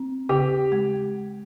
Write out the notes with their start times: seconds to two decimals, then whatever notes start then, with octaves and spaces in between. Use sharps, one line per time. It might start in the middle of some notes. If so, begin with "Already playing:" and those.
Already playing: C4
0.29 C#3 G4
0.72 G#3